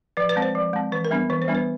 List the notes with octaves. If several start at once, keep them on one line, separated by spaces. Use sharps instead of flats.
F3 B4
B4
G#3 C4
C5
F3
G#3 C4
E3 B4
A#4
G3 B3 D4
E3 B4
C5
G3 B3 D4
B4